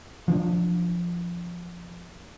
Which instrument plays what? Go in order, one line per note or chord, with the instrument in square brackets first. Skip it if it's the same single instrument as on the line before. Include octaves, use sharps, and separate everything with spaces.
[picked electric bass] F3 C#4 D4